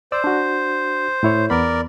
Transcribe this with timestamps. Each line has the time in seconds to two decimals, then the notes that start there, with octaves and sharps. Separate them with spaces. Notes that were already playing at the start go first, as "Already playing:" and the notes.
0.12 C5 D5 E6
0.24 D4 F#4
1.23 A2 E4 C#5
1.50 E2 B3 A#4 D5 B5